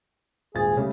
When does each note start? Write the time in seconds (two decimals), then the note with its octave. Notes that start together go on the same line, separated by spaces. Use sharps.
0.55 D#1 G#1 G#4 A6
0.77 C#3 G3 A3